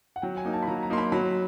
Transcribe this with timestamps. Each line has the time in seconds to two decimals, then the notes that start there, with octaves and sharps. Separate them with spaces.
0.16 F#5
0.22 F#3 G5
0.37 G#5
0.45 A#3 D#4
0.53 A5
0.63 B5
0.67 F#3 A#5
0.83 A#5
0.90 A#3 D#4 C6
0.98 B5
1.12 F#3 B5